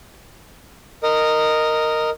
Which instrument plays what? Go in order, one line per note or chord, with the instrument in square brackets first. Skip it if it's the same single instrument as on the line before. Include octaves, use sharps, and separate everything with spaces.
[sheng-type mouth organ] A#4 D#5